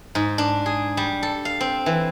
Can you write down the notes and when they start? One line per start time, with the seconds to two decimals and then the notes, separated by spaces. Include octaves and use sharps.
0.15 G#2
0.38 D4
0.66 G#4
0.97 G3
1.23 A4
1.45 F5
1.61 C4
1.86 E3